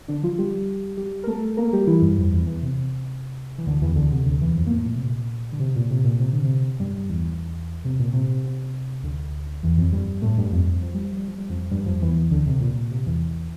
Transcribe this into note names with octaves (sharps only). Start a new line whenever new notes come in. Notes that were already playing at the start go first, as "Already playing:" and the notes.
D3 D4
F3 F4
G3 G4
G3 G4
A#4
A3 A4
A#3 A#4
G3 G4
E3 E4
G2 G3
F2 F3
E2 E3
E2 E3
C3
C3
E3
D2 D3
E2 E3
D2 D3
C3
D2 D3
E2 E3
F2 F3
A#3
A2 A3
A#2
C3
A#2
D3
C3
A#2
C3
A#2
C3
D3
C3
G2 G3
G2 G3
E2 E3
C3
A#2
C3
C3
D2 D3
E2 E3
F2 F3
G2 G3
A2 A3
G2 G3
F2 F3
F3
G3
F3
G3
F3
G3
F2 F3
G2 G3
F2 F3
E2 E3
D2 D3
C3
A#2
C3
E2 E3